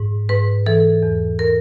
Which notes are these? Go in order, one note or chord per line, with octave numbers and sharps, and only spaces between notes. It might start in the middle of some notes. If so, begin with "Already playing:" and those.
Already playing: G#2
G#2 B4
E3 A4
E2
A#4